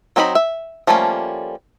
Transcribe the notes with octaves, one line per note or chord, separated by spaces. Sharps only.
F#3 C4 D#4 A#4 B5
E5
F3 G3 A3 A#3 C#4